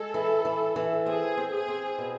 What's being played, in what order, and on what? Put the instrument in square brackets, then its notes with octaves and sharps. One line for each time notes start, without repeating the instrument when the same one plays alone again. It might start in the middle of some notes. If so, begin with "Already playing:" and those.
Already playing: [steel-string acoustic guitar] G#3 [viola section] A4
[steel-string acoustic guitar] E3
E3
E3
[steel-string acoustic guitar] C4 [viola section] G#4
[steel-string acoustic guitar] C4
[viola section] G#4
[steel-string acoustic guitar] C4
B2